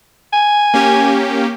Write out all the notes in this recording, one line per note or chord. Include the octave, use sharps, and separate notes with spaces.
G#5
A#3 C#4 G4